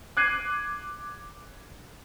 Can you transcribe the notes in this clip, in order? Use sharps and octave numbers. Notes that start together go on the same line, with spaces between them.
D6 F#6 G#6 C7 D#7